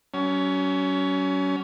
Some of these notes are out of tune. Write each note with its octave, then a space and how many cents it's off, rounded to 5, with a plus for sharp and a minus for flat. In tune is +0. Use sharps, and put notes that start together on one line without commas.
F#3 +35 C#4 +20